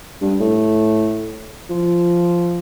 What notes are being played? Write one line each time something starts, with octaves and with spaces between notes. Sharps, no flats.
G2
A2
F3